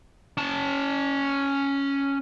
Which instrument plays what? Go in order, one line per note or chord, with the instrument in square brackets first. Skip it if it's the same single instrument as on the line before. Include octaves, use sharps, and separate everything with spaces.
[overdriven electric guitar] C#4 A5